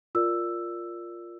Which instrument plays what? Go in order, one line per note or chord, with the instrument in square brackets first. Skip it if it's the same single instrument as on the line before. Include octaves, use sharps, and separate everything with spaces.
[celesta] F4 A#4 D5 E6